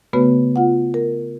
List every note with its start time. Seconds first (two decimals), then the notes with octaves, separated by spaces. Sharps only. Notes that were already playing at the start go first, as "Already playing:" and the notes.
0.13 C#3 A3 B3 F#4 B4
0.56 F4 F#5
0.94 A#4